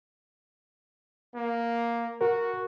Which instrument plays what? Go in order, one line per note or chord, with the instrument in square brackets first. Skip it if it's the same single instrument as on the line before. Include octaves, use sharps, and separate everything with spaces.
[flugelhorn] A#3
[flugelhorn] F#4 [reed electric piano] A#4